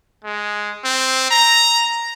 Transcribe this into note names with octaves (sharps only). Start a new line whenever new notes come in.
G#3
C4
A#5